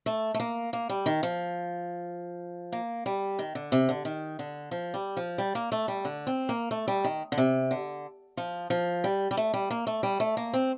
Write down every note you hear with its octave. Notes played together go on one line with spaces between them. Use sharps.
A3
A3
A#3
A#3
G3
D#3
F3
A#3
G3
D#3
D3
C3
D3
D#3
D3
F3
G3
F3
G3
A#3
A3
G3
D3
C4
A#3
A3
G3
D#3
D3
C3
D3
F3
F3
G3
G3
A3
G3
A#3
A3
G3
A3
A#3
C4